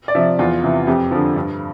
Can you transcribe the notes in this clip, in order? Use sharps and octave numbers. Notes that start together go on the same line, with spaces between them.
D5
C3 F3 E5
E2 F4
C3 E3
F2 G4
D3 F3
G2